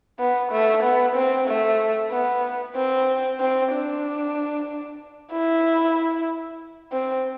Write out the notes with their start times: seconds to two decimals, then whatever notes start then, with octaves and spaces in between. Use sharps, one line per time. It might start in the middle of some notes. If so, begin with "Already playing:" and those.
0.19 B3
0.52 A3
0.83 B3
1.15 C4
1.48 A3
2.11 B3
2.76 C4
3.40 C4
3.72 D4
5.32 E4
6.92 C4